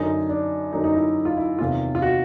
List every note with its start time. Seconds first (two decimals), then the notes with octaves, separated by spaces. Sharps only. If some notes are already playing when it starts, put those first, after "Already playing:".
Already playing: F#2 D3 F#3 D#4
0.29 D4
0.73 F#2 D3 F#3 D#4
0.84 D#4
0.95 E4
1.25 F4
1.37 E4
1.59 E2 C3 D#3 F4
1.95 F4
2.02 F#4